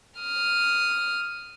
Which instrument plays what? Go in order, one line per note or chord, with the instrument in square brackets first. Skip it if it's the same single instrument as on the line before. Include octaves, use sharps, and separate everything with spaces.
[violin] D#6 F6